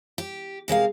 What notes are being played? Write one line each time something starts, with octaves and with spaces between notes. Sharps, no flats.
G4
C3 G#3 A#4 F5